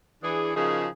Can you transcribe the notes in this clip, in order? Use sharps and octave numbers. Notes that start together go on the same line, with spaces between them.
E3 D4 G#4
C#3 F3 D#4 F#4 G#4 A#4